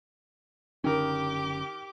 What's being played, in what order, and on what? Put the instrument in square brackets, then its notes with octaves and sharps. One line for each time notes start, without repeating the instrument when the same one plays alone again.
[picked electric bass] F#1 D3 C#4 [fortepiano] D#3 A#4 [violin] G4 D6